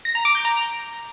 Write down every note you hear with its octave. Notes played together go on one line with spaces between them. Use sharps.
A#6
A#5
D6
G6
A#5